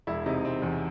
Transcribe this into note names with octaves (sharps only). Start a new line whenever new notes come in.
E1 E4
C3 D#4
E1 C4
E2